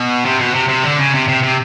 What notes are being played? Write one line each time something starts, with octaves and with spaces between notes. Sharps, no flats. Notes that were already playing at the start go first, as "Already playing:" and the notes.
Already playing: B2
C3
B2
C3
C3
D3
C#3
C3
C3
C3